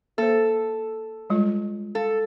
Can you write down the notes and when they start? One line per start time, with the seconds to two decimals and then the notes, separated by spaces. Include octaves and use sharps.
0.18 A#3 A4 C5
1.30 G3 G#3 F4
1.95 A4 F5